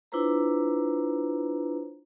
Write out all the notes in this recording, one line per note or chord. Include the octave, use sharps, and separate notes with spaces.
D4 E4 F4 B4 C5 A#5